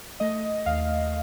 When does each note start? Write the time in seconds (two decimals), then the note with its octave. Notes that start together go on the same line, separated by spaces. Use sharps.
0.20 A3 D#5
0.66 D#2 F5